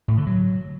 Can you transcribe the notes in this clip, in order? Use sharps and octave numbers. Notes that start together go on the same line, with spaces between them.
A2
D3
F#3